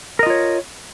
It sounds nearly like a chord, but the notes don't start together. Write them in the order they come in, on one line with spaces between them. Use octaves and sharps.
A#4 D#5 F4 C#5